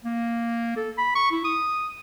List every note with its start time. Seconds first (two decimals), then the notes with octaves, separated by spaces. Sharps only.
0.05 A#3
0.77 A4
0.98 B5
1.15 C#6
1.32 E4
1.45 D#6